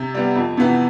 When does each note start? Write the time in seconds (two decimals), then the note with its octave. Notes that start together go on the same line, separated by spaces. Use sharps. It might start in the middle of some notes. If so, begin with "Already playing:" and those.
Already playing: C3
0.14 G3 B3
0.35 F2
0.57 C3 E3 B3